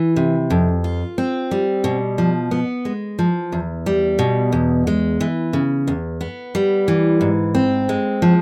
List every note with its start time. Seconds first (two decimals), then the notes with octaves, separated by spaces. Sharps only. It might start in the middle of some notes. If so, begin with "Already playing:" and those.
Already playing: E3
0.16 C3
0.50 F2
0.84 F4
1.18 C4
1.51 G3
1.84 B2
2.18 F3
2.51 B3
2.85 G#3
3.19 F3
3.52 E2
3.86 G3
4.19 B2
4.52 E2
4.87 G#3
5.21 E3
5.53 C#3
5.88 E2
6.21 B3
6.55 G3
6.88 E3
7.21 G#2
7.55 C4
7.89 G#3
8.22 F3